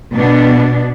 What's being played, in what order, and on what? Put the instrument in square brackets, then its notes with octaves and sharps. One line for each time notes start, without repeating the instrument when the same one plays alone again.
[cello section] B2 B3 D4